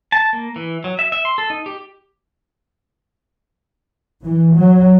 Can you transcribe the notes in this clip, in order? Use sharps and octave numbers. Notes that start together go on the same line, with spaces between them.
A5
A#3
E3
F#3
E5
E5
C6
A4
D#4
G4
E3
F#3